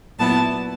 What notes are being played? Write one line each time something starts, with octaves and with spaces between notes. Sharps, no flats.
A#2 F#3 B3 E4 A5